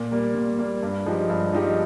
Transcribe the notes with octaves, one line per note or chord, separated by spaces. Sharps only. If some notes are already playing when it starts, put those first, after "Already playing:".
Already playing: A#2
G3 A#3
A#2
G3 A#3
G2
F3 G#3 D#4 G4
G2
F3 G#3 D#4 G4